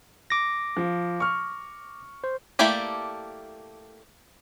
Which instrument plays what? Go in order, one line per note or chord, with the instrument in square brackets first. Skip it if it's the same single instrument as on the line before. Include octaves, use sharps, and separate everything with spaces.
[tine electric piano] D6 A#6
[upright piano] F3
C#6 F6
[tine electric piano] C5
[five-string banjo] A3 A#3 E4 G4 D5